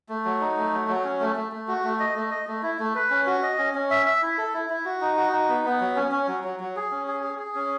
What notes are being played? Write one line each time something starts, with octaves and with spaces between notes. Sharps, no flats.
A3
F#3
D#4
A3
F#3
F#3
C#4
A3
A3
A3
F#4
A3
D#5
A3
D#5
A3
E4
A3
B4
C#4
F#4
D#5
C#4
C#4
E5
E5
E4
A4
E4
E4
F#4
D#4
F#4
D#4
B3
B3
F#3
C#4
C#4
F#3
F#3
F#3
G#4
C#4
G#4
G#4
G#4
C#4